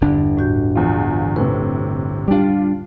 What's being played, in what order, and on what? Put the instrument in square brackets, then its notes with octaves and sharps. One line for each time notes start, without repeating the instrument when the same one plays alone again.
[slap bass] G1 D4 [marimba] E2 G2 D3
[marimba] A2 F#4 G6
[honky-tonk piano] E2 F3 F4
[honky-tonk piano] A2 C3 [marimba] B4
[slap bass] G3 D4 [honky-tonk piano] F4 G4